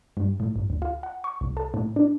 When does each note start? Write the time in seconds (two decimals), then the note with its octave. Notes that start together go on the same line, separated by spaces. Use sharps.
0.17 G2
0.40 A2
0.56 G1
0.70 D2
0.82 F4
1.03 F#5
1.24 C#6
1.41 C2
1.57 A4
1.74 A2
1.96 D4